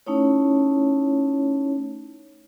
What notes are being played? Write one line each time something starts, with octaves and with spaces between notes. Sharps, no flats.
A3 C#4 D#4 E4 C#5